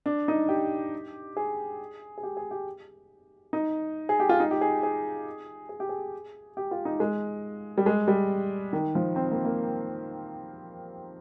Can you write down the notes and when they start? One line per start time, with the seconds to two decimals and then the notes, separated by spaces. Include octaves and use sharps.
0.06 D4
0.28 D#4
0.49 G4
1.37 G#4
2.18 G#4
2.23 G4
2.37 G#4
2.51 G4
3.53 D#4
4.09 G#4
4.20 G4
4.29 F4
4.40 D#4
4.51 G4
4.61 G#4
4.83 G#4
5.69 G#4
5.80 G4
5.89 G#4
6.57 G4
6.71 F4
6.85 D#4
7.00 G#3
7.78 G3
7.86 G#3
8.08 G3
8.73 D#3
8.95 F3
9.16 C4
9.32 A#3
9.45 A#3